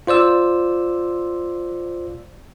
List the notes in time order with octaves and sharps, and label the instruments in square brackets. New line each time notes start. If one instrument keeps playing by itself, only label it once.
[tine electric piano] F4 C5 D5 E6